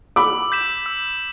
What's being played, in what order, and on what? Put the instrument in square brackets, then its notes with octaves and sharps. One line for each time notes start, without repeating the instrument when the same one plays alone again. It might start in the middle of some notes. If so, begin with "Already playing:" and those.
[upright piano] B5 D6 [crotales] E6
[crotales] G6 B6 E7
E6